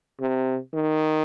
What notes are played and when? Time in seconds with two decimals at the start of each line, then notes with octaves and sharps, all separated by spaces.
0.21 C3
0.74 D#3